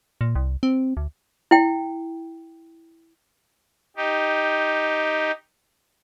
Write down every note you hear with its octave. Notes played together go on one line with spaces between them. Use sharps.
A#2
C2
C4
D2
E4 G5
D#4 G4